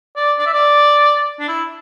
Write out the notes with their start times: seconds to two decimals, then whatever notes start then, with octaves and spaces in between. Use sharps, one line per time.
0.17 D5
0.39 D5
0.47 E5
0.54 D5
1.39 D4
1.48 E4